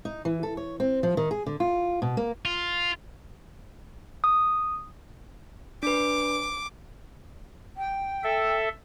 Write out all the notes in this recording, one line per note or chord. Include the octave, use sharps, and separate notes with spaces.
D#4
E3
A4
C#5
C4
F3
D#3
G#4
D3
F4
B2
A#3
F4
D#6
D4 B4 D6
G5
A4 E5